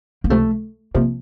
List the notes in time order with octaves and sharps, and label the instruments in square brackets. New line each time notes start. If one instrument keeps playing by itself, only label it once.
[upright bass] A#3
[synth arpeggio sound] C#2 C3 F3 [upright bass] A3
[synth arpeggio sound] C3 F3 [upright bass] A#3